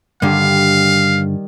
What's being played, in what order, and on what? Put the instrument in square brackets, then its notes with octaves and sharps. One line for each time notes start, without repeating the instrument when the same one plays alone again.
[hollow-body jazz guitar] G2 D3 [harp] D#3 G3 [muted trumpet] F5